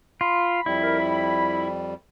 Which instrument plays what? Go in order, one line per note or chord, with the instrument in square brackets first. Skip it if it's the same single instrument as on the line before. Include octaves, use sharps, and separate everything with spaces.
[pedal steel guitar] F4 [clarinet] B5
[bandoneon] F2 G3 [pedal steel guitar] E4
[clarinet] A#4
B5